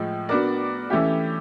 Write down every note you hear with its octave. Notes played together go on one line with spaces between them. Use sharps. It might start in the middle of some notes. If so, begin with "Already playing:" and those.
Already playing: A2 F3 G#3
B3 D4 F#4 A#4 D5
E3 A3 C#4 E4 G4